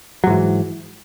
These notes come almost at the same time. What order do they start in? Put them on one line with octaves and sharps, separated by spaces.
F#3 G#2 E3